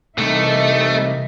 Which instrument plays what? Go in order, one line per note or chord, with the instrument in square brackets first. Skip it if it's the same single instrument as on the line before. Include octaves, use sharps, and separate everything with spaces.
[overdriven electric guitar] C2 [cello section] E3 D#4 E5 [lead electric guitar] A3